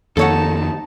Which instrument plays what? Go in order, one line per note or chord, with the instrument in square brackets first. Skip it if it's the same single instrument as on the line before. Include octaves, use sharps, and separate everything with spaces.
[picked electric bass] F2 D#3 A#3 [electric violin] D#4 A5 [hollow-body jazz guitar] A4 C#5 F#5